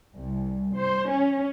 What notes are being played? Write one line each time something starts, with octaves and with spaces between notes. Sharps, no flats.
C2
C5
C#4